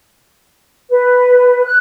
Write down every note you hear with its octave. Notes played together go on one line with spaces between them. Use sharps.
B4
F#6